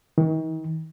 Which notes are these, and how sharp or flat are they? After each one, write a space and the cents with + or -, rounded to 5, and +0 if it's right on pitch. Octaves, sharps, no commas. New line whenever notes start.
D#3 +40